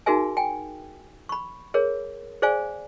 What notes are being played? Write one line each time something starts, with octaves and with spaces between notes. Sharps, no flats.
D#4 F#4 G#4 A#4 E5 G#5
G5 G#5
B5 C#6
G#4 A#4 C#5
G#4 C5 D5 F5 G#5